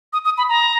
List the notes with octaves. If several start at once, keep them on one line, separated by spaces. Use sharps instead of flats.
D#6
D#6
B5
A#5